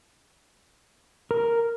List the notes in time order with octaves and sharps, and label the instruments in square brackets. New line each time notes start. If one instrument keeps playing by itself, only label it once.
[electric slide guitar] A#4